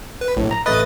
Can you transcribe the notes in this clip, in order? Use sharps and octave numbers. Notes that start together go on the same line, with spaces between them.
B4
A#1 A2
A#5
A1 A3 B4 D#5 D#6 A6